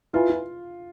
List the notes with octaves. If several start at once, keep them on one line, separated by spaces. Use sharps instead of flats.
E4 F4 B4 E5 G#5 B5
F4